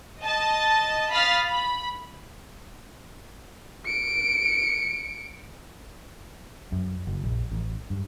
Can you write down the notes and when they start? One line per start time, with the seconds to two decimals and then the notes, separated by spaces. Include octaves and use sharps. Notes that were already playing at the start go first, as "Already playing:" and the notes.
0.22 D#5 A5
1.12 F5 B5 D#6 F6 A6 B6
1.45 B5
3.86 C#7 D7
6.72 F#2
7.07 F#1
7.23 A#1
7.52 A1
7.90 G2